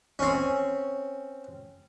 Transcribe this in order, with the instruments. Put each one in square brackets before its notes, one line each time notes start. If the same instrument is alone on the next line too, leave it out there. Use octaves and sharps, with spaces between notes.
[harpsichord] C4 C#4